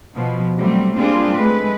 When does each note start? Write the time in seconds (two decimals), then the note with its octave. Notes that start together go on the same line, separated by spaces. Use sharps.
0.15 B2 F3
0.55 C3 F#3 G3 A3 C4
0.97 G3 A#3 C4 D4 F4 G#4
1.35 G#3 A3 B4